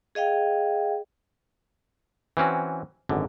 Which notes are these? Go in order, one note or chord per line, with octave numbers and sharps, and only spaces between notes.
G#4 D#5 F5 G5
E3 C4 C#4 F#4
G#1 F#2 D3